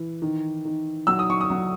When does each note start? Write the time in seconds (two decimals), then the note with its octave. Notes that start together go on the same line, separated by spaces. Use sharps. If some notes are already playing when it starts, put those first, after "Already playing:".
Already playing: E3
0.22 D#3
0.65 D#3
1.07 F#3 E6
1.19 D#6
1.30 C#6
1.41 D#6
1.50 F#3